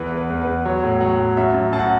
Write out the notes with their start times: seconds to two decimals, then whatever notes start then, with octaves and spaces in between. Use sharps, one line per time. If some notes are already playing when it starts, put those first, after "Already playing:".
Already playing: E2 E3 B4
0.12 E2
0.17 B4
0.30 E2
0.42 B4
0.47 E2
0.65 F#3 C#5
0.84 A2
1.00 F#3 F#5
1.18 A2
1.37 F#2 E5
1.54 F#2
1.73 F#2 A5
1.79 F#5